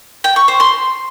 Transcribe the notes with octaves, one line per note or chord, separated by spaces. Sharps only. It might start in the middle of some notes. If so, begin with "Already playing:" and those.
G5
C#6
C5
C6